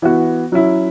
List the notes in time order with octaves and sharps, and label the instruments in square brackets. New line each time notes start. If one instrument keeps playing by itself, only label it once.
[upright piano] E3 B3 F#4
F#3 C#4 E4